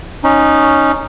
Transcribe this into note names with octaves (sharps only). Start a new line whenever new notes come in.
C#4 D#4